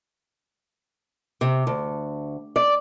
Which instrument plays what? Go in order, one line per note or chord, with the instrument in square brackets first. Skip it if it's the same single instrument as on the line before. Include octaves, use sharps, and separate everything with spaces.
[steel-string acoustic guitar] C3
D2
D5